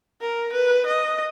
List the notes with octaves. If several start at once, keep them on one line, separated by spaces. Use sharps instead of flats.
A#4
B4
D#5